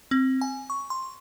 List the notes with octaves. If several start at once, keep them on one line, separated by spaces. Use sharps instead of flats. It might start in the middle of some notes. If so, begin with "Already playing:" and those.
C4
G#5
C#6
C6